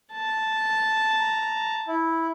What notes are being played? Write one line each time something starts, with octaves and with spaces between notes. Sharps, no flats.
A5
A#5
E4